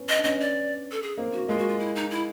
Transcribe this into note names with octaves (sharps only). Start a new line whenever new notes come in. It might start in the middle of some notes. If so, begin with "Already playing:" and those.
Already playing: B3 C#4
D#5
D4
B3 C#4 D#5
D5
A4
G#4
A#3 C4
F#4
G#3 A#3 F4
F#4
F4
E4
D#4
E4